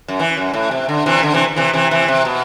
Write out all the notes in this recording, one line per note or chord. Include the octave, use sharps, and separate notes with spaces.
F#2
E3
F#2
A2
C3
D3
C3 E3
D3
C3 E3
C3 E3
C3 E3
C3 E3
C3
B2